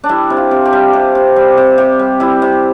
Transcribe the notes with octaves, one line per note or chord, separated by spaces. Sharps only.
D4
G3 E4
C3
F4
C3
G4
G3
C3
C3
G3
C3
C3 G4
G3
G3 E4
C3